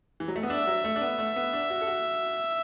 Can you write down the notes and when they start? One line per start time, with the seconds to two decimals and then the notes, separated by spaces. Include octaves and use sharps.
0.20 E3
0.28 F#3
0.36 A3
0.43 B3
0.50 D4 E5
0.67 F#3
0.84 A3
0.96 D4
1.01 B3
1.19 A3
1.36 B3
1.53 D4
1.70 F#4
1.81 A4
1.87 F#4